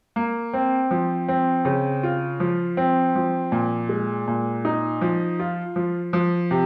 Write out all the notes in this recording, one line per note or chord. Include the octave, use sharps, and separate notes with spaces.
A#3
C4
F3
C4
C#3
F4
F3
C4
F3
A#2
G#3
A#2
D#4
F3
F4
F3
F3
C3